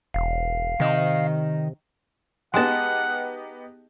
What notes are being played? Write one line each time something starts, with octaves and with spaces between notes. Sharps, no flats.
E1 F5
C3 D#3 D#5
G#3 B3 D#4 G4 F#5 A5